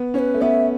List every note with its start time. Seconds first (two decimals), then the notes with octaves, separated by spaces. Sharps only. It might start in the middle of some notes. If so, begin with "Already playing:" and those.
Already playing: B3
0.14 C#4 C#5
0.19 B4
0.34 A3
0.41 B3 E5